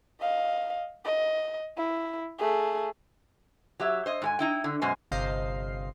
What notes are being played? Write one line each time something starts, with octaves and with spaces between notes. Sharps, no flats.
D#5 F5
D#5
E4
A3 G#4
F#3 G4 E5
C5 D#5
G#2 G4 G#5
D#4 E4 G5
D3
F#2 B2 G#3 F#4 C5 G#5
G1 C3 C5 D#5 F5 C7